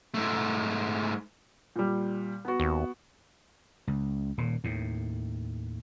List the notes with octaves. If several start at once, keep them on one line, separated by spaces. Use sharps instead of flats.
G#2 A3
A#2 G3
B3 F#4
D#2
C#2
D#1 A#2
D#2 A2